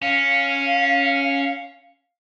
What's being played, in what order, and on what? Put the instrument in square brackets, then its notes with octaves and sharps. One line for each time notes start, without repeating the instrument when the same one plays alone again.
[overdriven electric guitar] C#4 [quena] F5